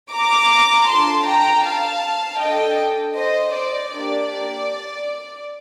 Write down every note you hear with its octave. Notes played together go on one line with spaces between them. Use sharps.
A#5 D6
D4 F4 A4 A5 C6
G5 A#5
F5 A5
D4 A4 D#5 G5
C5 D#5
D5
A#3 D4 G4 D5